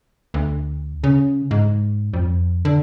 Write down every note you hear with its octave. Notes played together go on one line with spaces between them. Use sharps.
D2
C#3
G#2
F2
D3